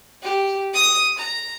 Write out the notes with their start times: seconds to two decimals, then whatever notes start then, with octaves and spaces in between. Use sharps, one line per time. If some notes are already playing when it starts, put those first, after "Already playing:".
0.23 G4
0.74 D#6
1.18 A#5